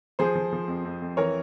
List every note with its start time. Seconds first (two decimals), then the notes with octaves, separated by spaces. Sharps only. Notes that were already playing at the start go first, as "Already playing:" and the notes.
0.19 F3 G#4 C5
0.35 F3
0.53 F3
0.68 F2
0.85 F2
1.02 F2
1.17 E3 A#4 C#5